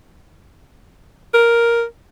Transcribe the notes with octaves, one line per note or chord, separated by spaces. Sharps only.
A#4